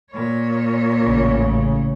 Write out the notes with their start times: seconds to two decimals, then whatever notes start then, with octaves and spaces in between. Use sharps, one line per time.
0.12 A#2 C#5
1.04 A1 C#3